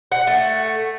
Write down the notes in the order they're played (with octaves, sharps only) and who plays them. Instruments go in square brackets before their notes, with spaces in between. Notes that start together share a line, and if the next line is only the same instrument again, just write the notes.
[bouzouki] F#5
A3